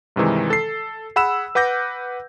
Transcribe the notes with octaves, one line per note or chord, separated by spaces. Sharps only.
G2 C3 D#3 E3 G#3
A4 C7
G#4 F#5 B5 E6 E7
B4 F#5 D6 G6 A#6